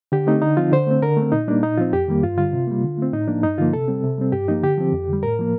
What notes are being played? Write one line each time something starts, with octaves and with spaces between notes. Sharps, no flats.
D3 G4
A3 C4 D#4
D3 D#4
F3 C4 F4
D3 C5
A3 C4
D3 A#4
A3 C4
A#2 D#4
G3 A#3 D4
A#2 D#4
F3 C4 F4
F2 G4
D#3 G3 A#3
G2 F4
D3 G3 F4
C3
G3 A#3
D3
A3 C4
A2 D#4
F3 A#3 D4
G2 D#4
D3 F3 A#3 F4
C3 A4
G3 C4
C3
G3 C4
G2 G4
F3 A#3 D#4
D3 G4
F3 C4
F2
D3 G3
A2 A#4
F3 A#3